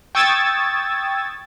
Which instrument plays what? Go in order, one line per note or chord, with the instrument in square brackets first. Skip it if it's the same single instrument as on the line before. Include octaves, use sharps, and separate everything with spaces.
[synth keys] G5 C#6 D#6 E6 G#6 A6